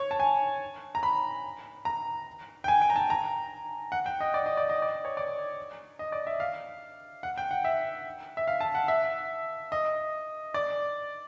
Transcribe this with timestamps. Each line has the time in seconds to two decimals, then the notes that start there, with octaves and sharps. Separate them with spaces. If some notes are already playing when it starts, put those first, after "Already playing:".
Already playing: C#5
0.11 A5
0.20 G#5
0.95 A#5
1.03 B5
1.85 A#5
2.64 G5
2.68 G#5
2.82 G5
2.90 A#5
2.96 A5
3.10 A#5
3.92 F#5
4.06 G5
4.21 D#5
4.34 D5
4.46 D#5
4.57 D5
4.70 D#5
4.82 D5
5.05 C#5
5.17 D5
5.99 D#5
6.12 D5
6.27 E5
6.40 F5
7.23 F#5
7.38 G5
7.51 F#5
7.65 E5
8.37 E5
8.48 F5
8.61 A5
8.75 F#5
8.88 E5
9.72 D#5
10.54 D5